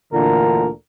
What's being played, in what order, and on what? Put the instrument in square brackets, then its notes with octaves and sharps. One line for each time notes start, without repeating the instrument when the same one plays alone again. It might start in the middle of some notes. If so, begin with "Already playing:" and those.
[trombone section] D2 A#2 D3 E3 A#4